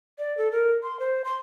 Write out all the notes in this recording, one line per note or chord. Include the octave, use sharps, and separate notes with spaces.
D5
A4
A#4
C6
C5
C6